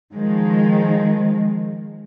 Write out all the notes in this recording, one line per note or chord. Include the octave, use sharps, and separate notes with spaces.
D#3 F3 G#3